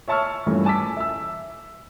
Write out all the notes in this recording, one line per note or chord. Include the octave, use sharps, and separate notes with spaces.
C#5 E5 A5 C#6 E6 F6
G2 A#2 E3 A3 A#3 C#4
G#5 A5 D6 E6 B6
E5 E6